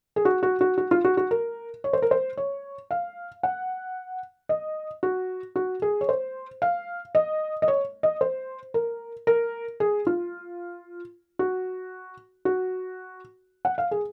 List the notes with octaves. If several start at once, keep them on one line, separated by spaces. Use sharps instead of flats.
G#4
F#4
F#4
F#4
F#4
F4
F#4
F#4
A#4
C#5
C5
A#4
C5
C#5
F5
F#5
D#5
F#4
F#4
G#4
C#5
C5
F5
D#5
D#5
C#5
D#5
C5
A#4
A#4
G#4
F4
F#4
F#4
F#5
F5
G#4